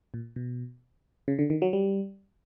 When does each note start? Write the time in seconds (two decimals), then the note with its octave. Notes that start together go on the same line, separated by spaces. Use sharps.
0.14 A#2
0.36 B2
1.28 C#3
1.39 D3
1.50 D#3
1.62 F#3
1.73 G3